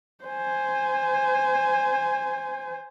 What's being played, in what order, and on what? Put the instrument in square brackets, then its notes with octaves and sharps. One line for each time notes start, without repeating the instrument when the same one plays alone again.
[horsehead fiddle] C5 G#5